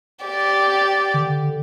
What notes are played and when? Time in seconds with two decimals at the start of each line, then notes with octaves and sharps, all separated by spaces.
0.25 G4 D5
1.14 D3